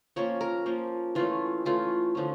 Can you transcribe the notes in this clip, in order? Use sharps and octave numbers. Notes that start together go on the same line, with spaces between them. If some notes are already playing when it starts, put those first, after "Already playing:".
F3 A#3 C#4 C#5
A#4
F3 A#3 C#4
E3 A3 C#4 F4
E3 A3 C#4 F4
D3 F3 C#4